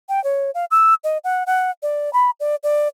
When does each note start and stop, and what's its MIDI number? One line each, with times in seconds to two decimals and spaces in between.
0.09 0.22 79
0.24 0.51 73
0.54 0.65 77
0.71 0.94 88
1.04 1.18 75
1.24 1.43 78
1.47 1.71 78
1.82 2.12 74
2.13 2.30 83
2.40 2.56 74
2.63 2.88 74